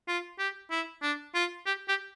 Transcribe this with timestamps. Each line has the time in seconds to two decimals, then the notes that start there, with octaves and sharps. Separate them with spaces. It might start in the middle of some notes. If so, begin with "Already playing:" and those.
0.08 F4
0.39 G4
0.71 E4
1.02 D4
1.35 F4
1.66 G4
1.88 G4